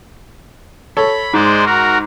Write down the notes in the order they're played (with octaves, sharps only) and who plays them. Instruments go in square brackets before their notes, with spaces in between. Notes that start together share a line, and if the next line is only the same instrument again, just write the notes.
[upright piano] A4 C#5 [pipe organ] B5
[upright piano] G#2 [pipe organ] G#3 C5 D5
[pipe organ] F#4 A#4